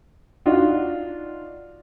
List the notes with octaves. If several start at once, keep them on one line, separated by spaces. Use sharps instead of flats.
D4 D#4 F4 F#4